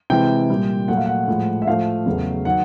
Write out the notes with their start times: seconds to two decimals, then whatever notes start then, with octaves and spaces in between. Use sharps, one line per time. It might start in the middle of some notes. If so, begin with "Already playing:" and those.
0.10 C3 E3 G#3 G5
0.50 A#2 G3
0.88 A#2 F#3 A3 F#5
0.97 F5
1.06 F#5
1.28 A2 F3 G#3
1.62 E5
1.67 A2 F3 A3 F5
2.06 E2 C#3 F#3 A3
2.45 D#3 F#3 F#5